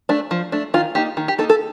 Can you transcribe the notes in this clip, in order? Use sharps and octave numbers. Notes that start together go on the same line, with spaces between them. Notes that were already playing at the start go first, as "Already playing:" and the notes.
A3 D4
F3
A3 D4
D#3 F4
A#3 D#4 G4
D#3
G4
A#3 D#4 A4
A4